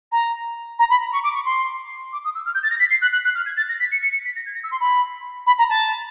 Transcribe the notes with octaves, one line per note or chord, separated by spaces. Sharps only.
A#5
A#5
B5
C#6
D6
C#6
C6
D6
D#6
E6
F6
G6
A6
A#6
B6
C7
F#6
F#6
F#6
F6
G#6
A6
A#6
B6
C#7
C#7
C#7
B6
A#6
G#6
A#6
E6
C6
B5
B5
A#5
A5